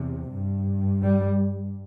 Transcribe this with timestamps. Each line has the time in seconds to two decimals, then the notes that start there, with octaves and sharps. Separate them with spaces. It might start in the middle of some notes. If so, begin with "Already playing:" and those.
Already playing: E2 C3
0.29 G2
1.02 G3